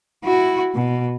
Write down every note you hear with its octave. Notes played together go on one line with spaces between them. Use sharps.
E4 F#4
B2